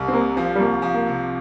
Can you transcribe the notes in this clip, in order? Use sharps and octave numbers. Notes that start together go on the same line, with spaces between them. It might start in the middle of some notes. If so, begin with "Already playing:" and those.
Already playing: C2
C4
C3 A#3
F3 C4
G3
C2 A#3
F3
A#3
C3